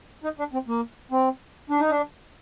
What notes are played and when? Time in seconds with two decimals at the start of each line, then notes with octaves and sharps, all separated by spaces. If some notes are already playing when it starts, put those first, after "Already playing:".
0.24 D#4
0.39 D4
0.53 C4
0.68 A#3
1.11 C4
1.70 D4
1.80 D#4
1.90 D4